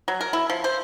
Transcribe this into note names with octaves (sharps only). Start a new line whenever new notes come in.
F#3
A#4
E4
F3
C5